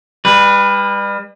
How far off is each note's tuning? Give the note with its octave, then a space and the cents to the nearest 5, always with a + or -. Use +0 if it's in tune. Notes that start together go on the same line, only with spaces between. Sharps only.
G3 +40 B4 +0